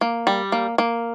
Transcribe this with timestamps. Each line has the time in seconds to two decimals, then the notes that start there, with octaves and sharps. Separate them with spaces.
0.01 A#3
0.27 G3
0.52 A#3
0.78 A#3